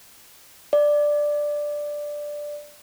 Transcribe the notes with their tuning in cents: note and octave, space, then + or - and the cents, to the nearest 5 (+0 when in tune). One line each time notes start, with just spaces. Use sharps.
D5 +5